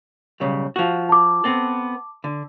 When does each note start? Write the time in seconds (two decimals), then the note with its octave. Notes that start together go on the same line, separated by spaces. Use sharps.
0.40 B1 C#3 G3
0.76 F3 F#4
1.09 A5 D6
1.44 B3 C4 A4
2.24 D3